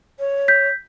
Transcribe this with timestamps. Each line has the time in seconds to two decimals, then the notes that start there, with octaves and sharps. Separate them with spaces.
0.19 C#5
0.48 G6 B6